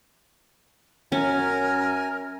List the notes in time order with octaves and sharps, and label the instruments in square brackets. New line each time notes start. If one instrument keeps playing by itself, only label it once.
[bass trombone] F#2 [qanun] C#4 [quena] A#4 [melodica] G#5